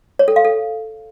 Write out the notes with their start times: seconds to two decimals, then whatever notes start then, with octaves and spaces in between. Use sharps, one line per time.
0.19 C#5
0.28 A4
0.36 F5
0.45 A4